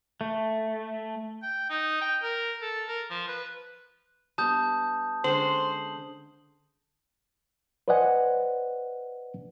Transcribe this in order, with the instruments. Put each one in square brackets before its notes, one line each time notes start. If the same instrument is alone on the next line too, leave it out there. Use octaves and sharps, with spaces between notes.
[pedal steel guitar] A3
[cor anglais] G5
D#4
G5
A#4
A4
A#4
F3
B4
[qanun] G3 B3 D4 [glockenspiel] A5 D#6 G6
[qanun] D3 G#3 C#4 [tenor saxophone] C5 [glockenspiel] F#7
[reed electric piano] B4 C5 D5 D#5 F#5 G#5